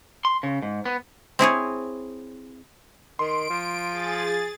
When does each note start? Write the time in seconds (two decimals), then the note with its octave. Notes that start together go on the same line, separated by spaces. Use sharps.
0.25 C6
0.43 C#3
0.62 G#2
0.86 B3
1.39 C4 E4 G#4 C#5
3.19 D#3 C6 D7
3.50 F3
3.90 G#4 A6